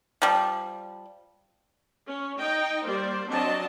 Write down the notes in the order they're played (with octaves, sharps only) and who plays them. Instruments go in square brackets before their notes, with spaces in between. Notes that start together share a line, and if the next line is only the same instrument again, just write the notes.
[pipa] F3 G3
[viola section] C#4
D#4 D#5 G5
G3 A#3 C5 D5
F#3 C4 D4 D#5 A5